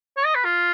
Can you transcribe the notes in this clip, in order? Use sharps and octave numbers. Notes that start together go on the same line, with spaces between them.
C#5
D#5
B4
F4